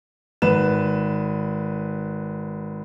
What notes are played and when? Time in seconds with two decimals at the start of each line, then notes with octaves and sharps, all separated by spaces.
0.42 G#1 B4 E7